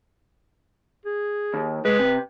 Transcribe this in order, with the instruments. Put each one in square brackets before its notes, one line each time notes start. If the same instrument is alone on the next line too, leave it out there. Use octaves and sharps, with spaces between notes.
[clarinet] G#4
[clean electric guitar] D#2
[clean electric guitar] G#3 [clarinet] B4
[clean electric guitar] C3